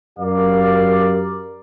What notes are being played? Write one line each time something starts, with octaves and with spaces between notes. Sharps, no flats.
F#2 G4 A#4 D5 F5